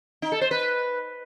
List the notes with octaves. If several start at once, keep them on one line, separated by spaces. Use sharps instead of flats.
D#4
A4
C5
B4